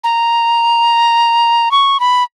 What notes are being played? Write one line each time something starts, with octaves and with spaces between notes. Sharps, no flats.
A#5
C#6
B5